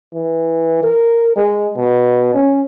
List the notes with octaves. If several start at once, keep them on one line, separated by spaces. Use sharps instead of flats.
E3
A#4
G#3
B2
C#4